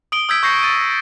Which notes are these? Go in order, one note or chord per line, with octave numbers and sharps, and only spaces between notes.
D#6 D7 G7
D#6 E6 G6 G#6 B6 D7
C#6 G6 A#6 C7 C#7
A6 D7 D#7